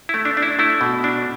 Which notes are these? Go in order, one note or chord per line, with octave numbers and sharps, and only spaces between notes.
E4
A3
D4
D4
E4
A3 E4
B2
D4